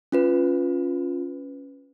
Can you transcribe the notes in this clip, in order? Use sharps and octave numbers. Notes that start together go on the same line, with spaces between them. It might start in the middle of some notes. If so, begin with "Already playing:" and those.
C#4 F4 B4